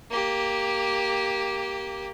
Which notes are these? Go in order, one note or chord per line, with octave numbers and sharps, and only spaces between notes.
A#3 G4